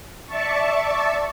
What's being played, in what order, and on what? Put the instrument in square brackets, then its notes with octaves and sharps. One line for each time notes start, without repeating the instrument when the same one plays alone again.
[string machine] D5 E5 A5 C#6